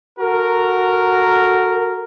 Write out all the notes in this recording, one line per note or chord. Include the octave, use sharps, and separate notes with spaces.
F#4 A4 A#4